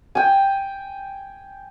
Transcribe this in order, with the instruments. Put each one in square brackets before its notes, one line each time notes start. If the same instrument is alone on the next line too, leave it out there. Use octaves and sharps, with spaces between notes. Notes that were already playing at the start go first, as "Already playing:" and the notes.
[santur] G5 G#5